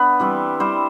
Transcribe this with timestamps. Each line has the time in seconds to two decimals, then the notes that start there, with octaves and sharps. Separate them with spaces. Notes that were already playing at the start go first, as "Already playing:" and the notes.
Already playing: B3 D4 B4
0.20 E3 G3 C4
0.60 E3 G3 C4 C5